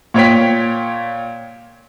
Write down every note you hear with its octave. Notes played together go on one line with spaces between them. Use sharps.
A#2 C#5 G5 B6